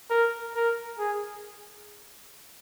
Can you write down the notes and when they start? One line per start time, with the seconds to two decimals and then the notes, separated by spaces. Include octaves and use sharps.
0.10 A#4
0.55 A#4
0.99 G#4